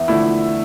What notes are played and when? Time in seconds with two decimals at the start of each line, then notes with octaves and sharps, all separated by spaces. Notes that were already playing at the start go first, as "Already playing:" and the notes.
Already playing: E2 E5
0.08 D3 F3 A3 E4